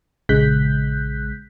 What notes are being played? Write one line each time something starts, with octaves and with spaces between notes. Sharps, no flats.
A#1 C#3 G#3 F#6 G6 B6